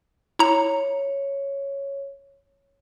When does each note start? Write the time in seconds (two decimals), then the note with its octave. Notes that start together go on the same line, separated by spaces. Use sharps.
0.39 E4 C#5 A#5